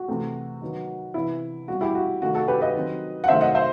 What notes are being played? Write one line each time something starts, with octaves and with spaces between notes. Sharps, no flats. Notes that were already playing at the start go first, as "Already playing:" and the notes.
Already playing: F#4
C3 E3 A3 C4
D#3 F#3 B3
C3 E3 B3 E4
B2 G3 C4 F#4
E4 G4
F#4
C3 D#3 A3 F#4
F#4 A4
G4 B4
B4 D#5
D#3 F#3 C4
F#5
C3 D#3 F#3 A3 C5 E5
D#5 F#5
C5 E5